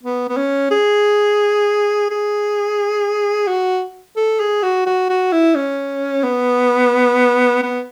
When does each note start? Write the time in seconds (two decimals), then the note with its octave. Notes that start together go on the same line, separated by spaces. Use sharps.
0.03 B3
0.29 B3
0.37 C#4
0.71 G#4
2.10 G#4
3.47 F#4
4.17 A4
4.40 G#4
4.63 F#4
4.86 F#4
5.10 F#4
5.32 E4
5.55 C#4
6.24 B3
7.63 B3